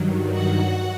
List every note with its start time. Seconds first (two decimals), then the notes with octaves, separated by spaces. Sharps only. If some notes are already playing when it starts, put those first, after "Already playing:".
Already playing: G2 D#3 F#3
0.31 F#4 F#5